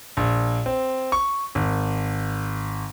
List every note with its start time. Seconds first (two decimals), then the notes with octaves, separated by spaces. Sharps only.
0.17 A#1
0.66 C4
1.12 C#6
1.55 G#1